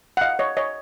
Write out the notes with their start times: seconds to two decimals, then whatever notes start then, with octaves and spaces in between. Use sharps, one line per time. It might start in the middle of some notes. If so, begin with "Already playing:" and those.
0.17 F#5
0.21 D#5 F5
0.39 C#5 D#5
0.57 C#5 D#5